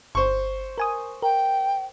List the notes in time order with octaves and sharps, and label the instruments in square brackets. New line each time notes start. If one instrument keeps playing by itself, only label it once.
[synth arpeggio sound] G1 [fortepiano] C5 C#6
[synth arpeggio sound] A#4 G#5 D#6
[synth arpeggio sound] A#4 [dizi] G5